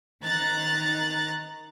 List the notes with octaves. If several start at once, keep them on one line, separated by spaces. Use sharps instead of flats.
D#3 A#5 F#6 A6